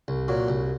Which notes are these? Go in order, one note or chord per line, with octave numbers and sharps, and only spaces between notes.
C2
A#2 F#3
C2